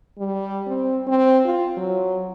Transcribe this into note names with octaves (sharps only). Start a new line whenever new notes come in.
G3
C4
C4
F4
F#3